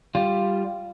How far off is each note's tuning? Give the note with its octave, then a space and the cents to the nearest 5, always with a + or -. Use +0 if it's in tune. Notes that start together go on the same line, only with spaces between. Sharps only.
G3 +0 F4 +0